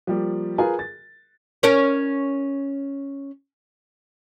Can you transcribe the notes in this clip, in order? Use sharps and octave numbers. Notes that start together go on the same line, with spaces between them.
F3 G3 A#3
F4 G#4 A#4 B4 G#5
A6
C#4 A#4 C#5